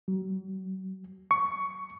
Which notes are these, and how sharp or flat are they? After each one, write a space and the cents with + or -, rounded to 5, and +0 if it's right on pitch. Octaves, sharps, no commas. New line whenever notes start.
F#3 +35
C#6 +10